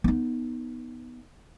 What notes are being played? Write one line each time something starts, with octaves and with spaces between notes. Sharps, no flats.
B3 D#4